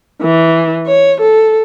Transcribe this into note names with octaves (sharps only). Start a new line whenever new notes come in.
E3
C#5
A4